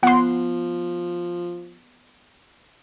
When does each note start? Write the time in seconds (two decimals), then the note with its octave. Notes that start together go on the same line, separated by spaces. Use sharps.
0.03 F3 B3 F#5 C6